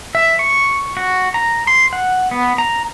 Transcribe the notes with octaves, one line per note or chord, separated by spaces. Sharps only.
E5
C#6
F#4
A#5
C6
F#5
B3
A#5